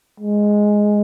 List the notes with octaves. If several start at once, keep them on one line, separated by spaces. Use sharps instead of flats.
G#3